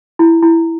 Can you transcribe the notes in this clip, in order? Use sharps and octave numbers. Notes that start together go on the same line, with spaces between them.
E4
E4